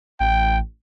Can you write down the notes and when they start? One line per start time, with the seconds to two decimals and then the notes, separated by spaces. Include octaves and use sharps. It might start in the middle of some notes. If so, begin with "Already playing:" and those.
0.20 A1 G5